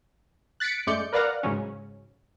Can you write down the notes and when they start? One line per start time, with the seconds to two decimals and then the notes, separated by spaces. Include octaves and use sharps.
0.60 F#6 A6 B6 C#7 D7
0.87 F#2 G#3 A3 D5 G6 C#7
1.13 A#4 B4 D5 F5 F#5 A#5
1.43 G#2 C#3 F#3 C#4